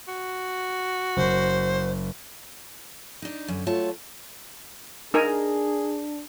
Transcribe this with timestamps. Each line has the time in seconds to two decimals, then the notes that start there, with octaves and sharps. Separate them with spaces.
0.08 F#4
1.17 F#1 C5
3.22 D4 D#4
3.48 F#2 D3
3.66 F#3 A3 F4 C#5 A5
5.14 D4 D#4 G#4 A#4 G#5